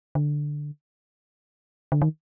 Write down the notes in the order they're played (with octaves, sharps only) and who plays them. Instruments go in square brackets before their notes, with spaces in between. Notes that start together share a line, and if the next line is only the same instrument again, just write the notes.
[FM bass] D3
D3
D#3